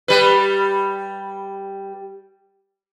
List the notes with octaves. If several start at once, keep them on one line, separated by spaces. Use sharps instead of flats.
G3 B4